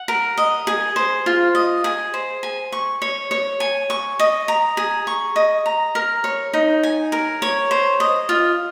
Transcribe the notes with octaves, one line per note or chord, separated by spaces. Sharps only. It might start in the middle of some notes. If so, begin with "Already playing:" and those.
Already playing: F#5
A#4
D#5
G#4
C5
F4
D#5
G#4
C5
G#5
C#6
C#5
C#5
G#5
C#6
D#5
A#5
G#4
C#6
D#5
A#5
A#4
C#5
D#4
G#5
A#4
C#5
C5
D#5
F4